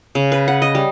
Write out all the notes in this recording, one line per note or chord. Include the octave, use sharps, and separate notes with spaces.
C#3
B4
F#5
D#5
G3